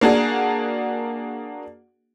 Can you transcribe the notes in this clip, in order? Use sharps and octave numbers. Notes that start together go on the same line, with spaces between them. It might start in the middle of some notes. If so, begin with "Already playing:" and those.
A#3 D4 F#4 G#4